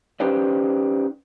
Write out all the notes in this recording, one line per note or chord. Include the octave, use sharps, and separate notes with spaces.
C#4 D#4 G4 B4 C5 D5